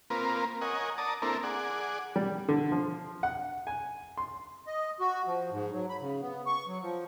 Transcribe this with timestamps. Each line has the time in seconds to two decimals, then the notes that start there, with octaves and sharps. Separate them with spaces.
0.10 A#3 C4 F4 A#4 B4
0.61 A#4 C#5 D#5 F#5 G#5
0.98 D5 A5 A#5 D#6
1.22 A#3 C4 D4 E4 A4 A#4
1.43 G#4 D5 F#5
2.16 G3
2.49 D3
2.72 F3
3.23 F#5
3.67 G#5
4.18 C6
4.67 D#5
5.00 F#4
5.27 F3
5.51 G#2
5.73 F#3
5.89 B5
6.01 C#3
6.22 B3
6.46 C#6
6.67 F#3
6.82 F3